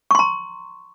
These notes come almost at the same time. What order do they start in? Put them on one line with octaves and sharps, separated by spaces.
C#6 C6 A#5